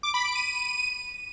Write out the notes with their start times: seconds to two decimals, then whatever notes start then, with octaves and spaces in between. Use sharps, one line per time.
0.03 D6
0.14 B5
0.25 D7
0.35 D#7